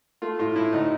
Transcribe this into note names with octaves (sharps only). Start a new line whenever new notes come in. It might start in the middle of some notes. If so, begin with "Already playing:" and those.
A3 F4
A2 F4
A2 E4
D2 D#4